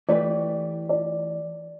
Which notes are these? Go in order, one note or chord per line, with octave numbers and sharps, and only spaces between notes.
E3 A3 E4 G4 B4 D5
D5